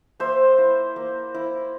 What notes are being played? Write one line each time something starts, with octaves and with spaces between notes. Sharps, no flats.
A#3 C5 E5
E4
A#3
E4